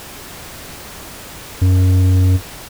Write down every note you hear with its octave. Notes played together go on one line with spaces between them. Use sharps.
F#2